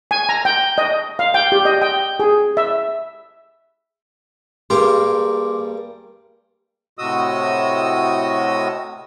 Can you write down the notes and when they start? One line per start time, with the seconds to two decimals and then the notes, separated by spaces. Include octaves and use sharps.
0.11 G#5
0.29 A#5
0.45 G5
0.78 D#5
1.19 F5
1.34 G5
1.52 G4
1.65 D#5
1.82 G5
2.20 G#4
2.57 E5
4.70 G2 G3 A#3 G4 G#4 A#4 C6 D6
6.99 A2 C3 F#4 D#5 D#6 E6